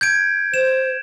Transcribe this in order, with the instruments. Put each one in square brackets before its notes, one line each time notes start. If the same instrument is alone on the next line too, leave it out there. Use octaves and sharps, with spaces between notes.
[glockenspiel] G6 G#6 D7
[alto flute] C5 [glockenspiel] E7